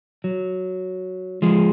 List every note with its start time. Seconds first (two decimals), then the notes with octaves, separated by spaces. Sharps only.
0.24 F#3
1.42 F3 G#3